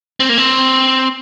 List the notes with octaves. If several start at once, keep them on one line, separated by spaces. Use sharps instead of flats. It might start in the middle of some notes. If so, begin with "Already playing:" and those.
C4
A#3
C4